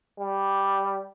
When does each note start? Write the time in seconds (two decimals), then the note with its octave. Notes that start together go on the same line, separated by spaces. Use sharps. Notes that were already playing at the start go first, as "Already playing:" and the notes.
0.20 G3